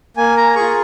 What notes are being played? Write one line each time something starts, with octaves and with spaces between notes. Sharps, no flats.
A#3 G#5
A#5
F4 G#4 C#6